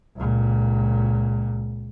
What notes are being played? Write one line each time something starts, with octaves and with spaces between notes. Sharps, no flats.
C#2 A#2